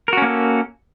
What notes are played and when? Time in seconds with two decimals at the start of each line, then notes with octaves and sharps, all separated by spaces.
0.08 A#4
0.13 F#4
0.17 C#4
0.22 A#3
0.27 A4